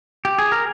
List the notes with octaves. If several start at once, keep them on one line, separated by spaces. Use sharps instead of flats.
G4
G#4
A#4